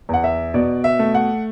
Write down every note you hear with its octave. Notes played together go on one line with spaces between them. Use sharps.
E2 F#5
E5
B2 D5
E5
A3
F#5